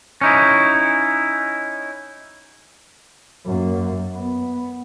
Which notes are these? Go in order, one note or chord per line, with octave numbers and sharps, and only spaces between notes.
C#4 D#4 E4
F#2 A#3
B3